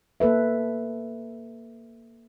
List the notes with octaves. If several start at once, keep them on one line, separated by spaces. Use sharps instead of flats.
A#3 A4 B4 E5